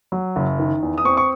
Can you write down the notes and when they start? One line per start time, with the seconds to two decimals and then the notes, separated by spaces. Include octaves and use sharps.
0.12 F#3
0.36 F#1
0.59 D#3
0.83 E2
0.98 D#6
1.05 C4 C#6
1.17 C#6